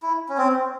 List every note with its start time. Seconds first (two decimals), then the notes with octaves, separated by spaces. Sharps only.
0.03 E4
0.29 C#4
0.38 C4